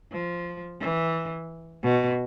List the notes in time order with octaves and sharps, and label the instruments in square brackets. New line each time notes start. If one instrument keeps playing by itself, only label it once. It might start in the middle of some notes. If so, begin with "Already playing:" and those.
[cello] F3
E3
B2